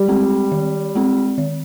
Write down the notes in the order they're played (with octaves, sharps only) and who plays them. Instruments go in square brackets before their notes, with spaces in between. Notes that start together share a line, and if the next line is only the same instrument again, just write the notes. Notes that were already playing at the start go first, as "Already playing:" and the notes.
Already playing: [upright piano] G3
[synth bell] G#3 C4
D#3
G#3 C4
D#3